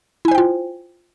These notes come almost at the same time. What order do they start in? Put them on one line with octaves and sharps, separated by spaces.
E4 G#5 C5 G5 F4